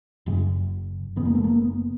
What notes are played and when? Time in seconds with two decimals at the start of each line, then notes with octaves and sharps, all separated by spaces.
0.26 F#1 F#2 C#3
1.16 F#1 F#2 C#3 B3
1.25 A#3
1.35 A3
1.44 A#3
1.62 B3